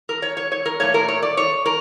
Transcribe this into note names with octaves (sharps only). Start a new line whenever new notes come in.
A#4
C#5
C#5
C#5
A#4
A#2 F3 A3 C#5
A#4
C#5
D5
C#5
A#4